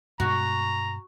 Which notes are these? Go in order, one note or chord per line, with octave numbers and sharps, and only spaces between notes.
G2 B2 G#3 F#4 A#5